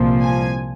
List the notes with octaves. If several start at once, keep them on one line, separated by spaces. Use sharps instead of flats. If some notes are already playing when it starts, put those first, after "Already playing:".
Already playing: C2 A#2 F3
G#5